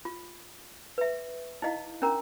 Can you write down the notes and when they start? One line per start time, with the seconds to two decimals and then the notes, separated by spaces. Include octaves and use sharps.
0.05 F4
0.98 B4 E5
1.62 D#4 E4 D#5 F5
2.02 C#4 D4 A#4 A#5